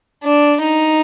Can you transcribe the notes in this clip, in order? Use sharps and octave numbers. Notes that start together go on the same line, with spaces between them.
D4
D#4